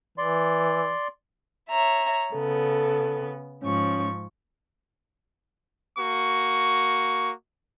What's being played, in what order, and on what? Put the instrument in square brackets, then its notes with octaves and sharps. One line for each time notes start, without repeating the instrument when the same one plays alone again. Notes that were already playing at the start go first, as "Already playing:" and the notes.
[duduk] E3 [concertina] D5 C6
[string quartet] C#5 E5 A#5
[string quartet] C#3 B3 [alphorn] A4
[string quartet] G#2 F3 C#6 [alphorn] C#4
[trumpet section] A#3 F#4 C#6